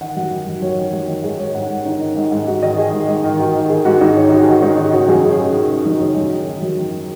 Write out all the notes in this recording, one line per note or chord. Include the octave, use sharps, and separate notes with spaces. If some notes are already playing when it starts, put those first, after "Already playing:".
D#3 F#5
F#2
D#3
F#2
F#2 C#5
D#3
F#2
D#3
G#2 G#4
G#2 C#5
G#2 F#5
G#2
D#3 D#4
D#3
G#2
G#2
G#2 F#4
D#3 D#5
D#3 G#4
G#2
G#2
D#3
D#3 F#4
D#3
D#3 G#4
G#2 F#4
G#2 D#4
D#3 C#5
D#3 F#4
G#4
D#3 F#4
G#2 D#4
D#3 D#4
C#3 F#4
F#2 G#4
C#3 G#4
C#3
C#3
C#3
F#2 D#4
C#3
F#2
D#3
D#3
F#2
D#3
D#3